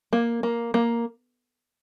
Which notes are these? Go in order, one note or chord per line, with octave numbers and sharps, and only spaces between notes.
A#3
A#3
A#3